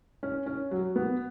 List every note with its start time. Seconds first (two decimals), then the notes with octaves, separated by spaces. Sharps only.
0.23 C#4
0.46 C#4
0.71 F#3
0.96 B3